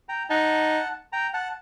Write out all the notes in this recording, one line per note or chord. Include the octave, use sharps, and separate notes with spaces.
G5 A#5
D#4 F#5 A5
G5 A#5
F#5 A5